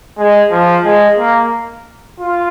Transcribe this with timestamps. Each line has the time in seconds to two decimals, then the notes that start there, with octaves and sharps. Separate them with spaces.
0.18 G#3
0.51 F3
0.85 G#3
1.18 A#3
2.19 F4